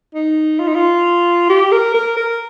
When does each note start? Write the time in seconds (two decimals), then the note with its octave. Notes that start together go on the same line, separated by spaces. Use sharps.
0.14 D#4
0.59 F4
0.68 D#4
0.75 F4
1.49 G4
1.72 A#4
1.94 A#4
2.17 A#4